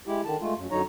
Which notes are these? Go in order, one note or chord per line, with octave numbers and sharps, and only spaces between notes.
G#3 E4 G4
D3 D#3 A5
G#3 A3 F4
F#2
F#2 D3 F#3 D#4 C#5 A#5